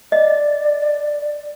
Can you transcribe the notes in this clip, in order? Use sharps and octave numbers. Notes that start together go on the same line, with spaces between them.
D5 D#5